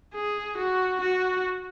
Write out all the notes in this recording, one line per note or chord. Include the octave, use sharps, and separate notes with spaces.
G#4
F#4
F#4